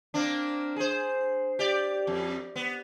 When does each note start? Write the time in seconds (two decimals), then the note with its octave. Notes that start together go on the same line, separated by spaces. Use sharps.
0.14 A#3 C4 D4
0.76 G#4 C5
1.59 G4 D5
2.07 F2
2.56 B3